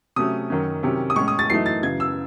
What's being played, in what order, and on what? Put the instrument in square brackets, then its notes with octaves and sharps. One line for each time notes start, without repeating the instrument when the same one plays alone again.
[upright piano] C3 F#3 A3 C#4 D#6
F#2 D#3 F#3 C#4
C3 D#3 F#3 C#4
D#6
A2 G#3 C#4 C#6
D#6
A6
F#2 E3 A3 D#4 C7
A6
F#2 C#3 E3 G#6
E6